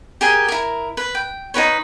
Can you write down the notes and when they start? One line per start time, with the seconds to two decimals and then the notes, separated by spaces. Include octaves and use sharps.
0.21 G4 G#4 A#4 G#5
0.48 E4 A#4
0.97 B4
1.15 G5
1.54 D#4 G4 B4 C#5